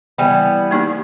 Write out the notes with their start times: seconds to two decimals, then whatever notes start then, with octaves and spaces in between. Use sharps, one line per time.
0.18 E3 G3 B3
0.71 A#3 D#4 G4